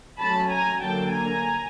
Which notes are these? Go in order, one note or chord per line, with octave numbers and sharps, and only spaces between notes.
F#3 A3 C#4 A5 B5
G#5 A#5
D3 F#3 A#3 D4 G5 A5
G#5 A#5